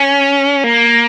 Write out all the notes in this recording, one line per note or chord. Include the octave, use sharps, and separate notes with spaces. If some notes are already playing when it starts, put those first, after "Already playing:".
Already playing: C#4
A#3